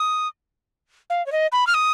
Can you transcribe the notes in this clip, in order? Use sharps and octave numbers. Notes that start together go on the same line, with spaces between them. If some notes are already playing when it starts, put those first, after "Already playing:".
Already playing: D#6
F5
C#5
D#5
B5
F6
D#6